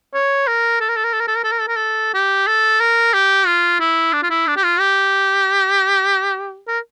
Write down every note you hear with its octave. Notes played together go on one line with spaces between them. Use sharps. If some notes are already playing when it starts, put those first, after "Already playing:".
C#5
A#4
A4
A#4
A4
A#4
A4
A#4
A4
A#4
A4
A#4
A4
A#4
A4
G4
A4
A#4
G4
F4
E4
D4
F4
E4
D4
G4
F4
G4
A#4